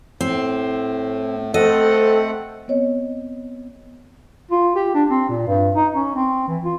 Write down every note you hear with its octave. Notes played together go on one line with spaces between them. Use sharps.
A2 C4
A3 C4 A4 D#5 F#5
B3 C4 C#5 D#5
F4
G4
D4
C4
A#2
G2
D#4
C#4
C4
E3
F4